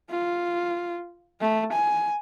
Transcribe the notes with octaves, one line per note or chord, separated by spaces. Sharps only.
F4
A3
G#5